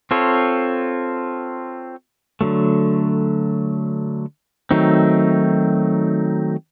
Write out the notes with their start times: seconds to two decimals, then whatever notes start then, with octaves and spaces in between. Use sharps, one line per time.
0.11 C4 F4 A4 C#5
2.41 D3 F#3 A3
4.71 D#3 F#3 A3 C4 D#4